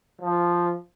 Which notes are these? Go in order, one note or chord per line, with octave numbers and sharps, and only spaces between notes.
F3